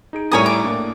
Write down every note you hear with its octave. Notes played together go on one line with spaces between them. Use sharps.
D#4 G#4 D7
A2 G3 C#5 G#5 A#5 D#6
D6
A2 A#3 D4